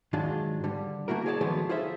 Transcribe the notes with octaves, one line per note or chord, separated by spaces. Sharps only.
G#2 D#3 F#3 G#3 D4 F4
D3 G3
A3 A#3 E4 F#4 A#4
G#4 C#5 D5 E5 A5
D#3 F3 F#3 G#3 A3 B3
F4 G#4 A4 C5 E5